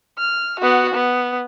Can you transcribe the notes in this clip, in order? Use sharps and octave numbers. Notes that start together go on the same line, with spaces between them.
F6
B3 F#4
B3